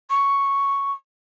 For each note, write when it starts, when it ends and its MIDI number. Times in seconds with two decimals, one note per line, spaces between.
0.10 0.92 85